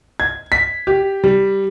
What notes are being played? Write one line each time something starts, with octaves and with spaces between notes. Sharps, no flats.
G#6
B6
G4
G3